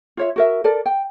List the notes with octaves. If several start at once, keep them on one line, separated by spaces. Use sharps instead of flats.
F4 C#5 E5
F#4 A#4 E5
A4 A#4 D5
G5